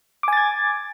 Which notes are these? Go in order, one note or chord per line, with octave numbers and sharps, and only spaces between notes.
G#5 D6 G#6 A6